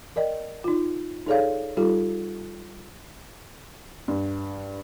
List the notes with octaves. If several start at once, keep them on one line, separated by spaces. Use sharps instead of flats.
A#4 D5 D#5 G5
D#4 F4
D#4 G#4 A4 C#5 D5 F5
G3 D#4 F4 G4 A4
G2